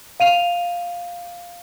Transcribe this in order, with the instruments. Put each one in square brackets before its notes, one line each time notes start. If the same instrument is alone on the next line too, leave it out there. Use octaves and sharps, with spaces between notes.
[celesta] F5 D#7 F7